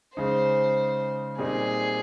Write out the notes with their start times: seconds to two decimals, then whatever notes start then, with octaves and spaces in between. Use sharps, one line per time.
0.17 C#3 G#3 D#4 C5
1.38 A#2 G3 C4 D#4 G#4